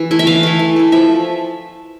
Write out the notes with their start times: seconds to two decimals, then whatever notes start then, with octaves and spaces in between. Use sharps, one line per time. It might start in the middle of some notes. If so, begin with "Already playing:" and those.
Already playing: E3
0.11 A3 E4
0.19 E5
0.27 E3 F5
0.43 A3 E4
0.59 E3
0.76 A3 E4
0.92 F3 E5